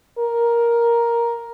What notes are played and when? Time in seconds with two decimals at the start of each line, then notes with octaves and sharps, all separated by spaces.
0.18 A#4